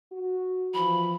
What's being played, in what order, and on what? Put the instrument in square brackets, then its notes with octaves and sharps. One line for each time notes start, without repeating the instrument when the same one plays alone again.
[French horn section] F#4
[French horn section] E3 F3 [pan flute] B5